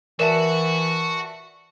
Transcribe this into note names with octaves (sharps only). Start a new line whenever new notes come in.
E3 F#4 A#4 D5 E5 A5 E7